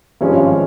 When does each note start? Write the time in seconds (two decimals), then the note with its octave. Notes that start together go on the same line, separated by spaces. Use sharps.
0.21 G#1 G2 F3 G#3 C#4